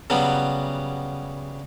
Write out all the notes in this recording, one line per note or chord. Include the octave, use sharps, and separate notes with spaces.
C#3 F#3 G3 B3